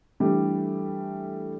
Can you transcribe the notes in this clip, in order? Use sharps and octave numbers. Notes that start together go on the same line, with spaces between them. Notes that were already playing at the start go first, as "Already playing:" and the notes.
E3 G3 A3 D4 G4